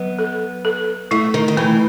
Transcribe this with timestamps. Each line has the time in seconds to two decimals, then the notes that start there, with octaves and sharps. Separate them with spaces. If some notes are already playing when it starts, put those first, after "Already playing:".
Already playing: F#3 B3
0.19 A4
0.65 A4
1.11 A3 E4
1.34 D#3
1.48 D#3
1.57 E3 A3